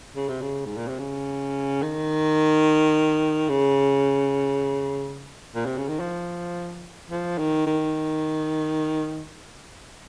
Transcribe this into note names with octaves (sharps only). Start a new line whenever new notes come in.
C#3
C3
C#3
G#2
A#2
C3
C#3
D#3
C#3
A#2
C3
C#3
D#3
F3
F3
D#3
D#3